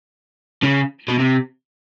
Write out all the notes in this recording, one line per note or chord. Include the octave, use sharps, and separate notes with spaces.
C#3
B2
C3